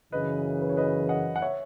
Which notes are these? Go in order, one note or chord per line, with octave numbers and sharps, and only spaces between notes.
F#2 C#3 E3 B4 D#5
B4
C#5
B4 D#5
D#5 F#5
F#5
C#5 E5